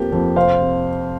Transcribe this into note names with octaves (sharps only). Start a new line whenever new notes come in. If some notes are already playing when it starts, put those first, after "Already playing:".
Already playing: F2 F3 A#3 G4
F2
C3 C5 F5
C3